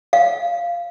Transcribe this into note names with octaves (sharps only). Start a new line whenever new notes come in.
F5